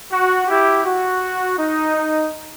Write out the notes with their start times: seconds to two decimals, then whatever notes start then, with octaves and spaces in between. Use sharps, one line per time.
0.11 F#4
0.47 E4 G4
0.85 F#4
1.59 D#4